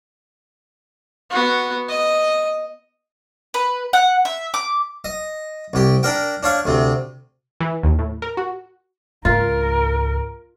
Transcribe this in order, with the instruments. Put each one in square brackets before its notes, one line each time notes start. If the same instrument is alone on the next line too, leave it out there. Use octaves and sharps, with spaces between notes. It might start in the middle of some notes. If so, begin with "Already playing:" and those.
[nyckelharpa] B3 F#4
D#5
[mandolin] B4
F#5
E5
D6
[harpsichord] D#5
C2 G4
D4 A#4 G5
D4 C#5 F5
D2 C3
[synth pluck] E3
D#2
A2
A#4
F#4
[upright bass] C#2 G#2 [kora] F4 [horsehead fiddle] A#4